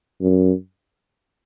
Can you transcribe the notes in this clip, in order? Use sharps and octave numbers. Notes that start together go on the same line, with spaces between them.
F#2